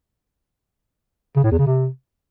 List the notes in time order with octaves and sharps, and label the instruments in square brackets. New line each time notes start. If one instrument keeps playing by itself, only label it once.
[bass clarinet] C#3
A2
E2
C#3
C3